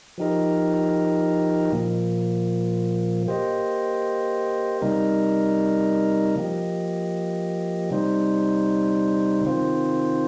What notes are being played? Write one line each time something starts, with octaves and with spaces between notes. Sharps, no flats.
F3 D#4 G4 A#4 D#5
A#2 F3 A#3
A#3 G4 C5 D#5
C3 G3 D#4 A#4 D#5
F3 A#3 G4 D#5
C3 G3 D#4 C5
C3 D#3 C4 F4 C5